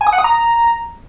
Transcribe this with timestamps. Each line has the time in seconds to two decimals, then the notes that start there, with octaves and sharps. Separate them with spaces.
0.01 G#5
0.07 D#6
0.13 F#5
0.18 D#6
0.24 A#5